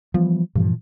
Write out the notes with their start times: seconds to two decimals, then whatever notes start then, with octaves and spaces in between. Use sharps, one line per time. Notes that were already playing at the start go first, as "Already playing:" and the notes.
0.14 E3 F3 G3 B3
0.56 G2 A#2 E3 F3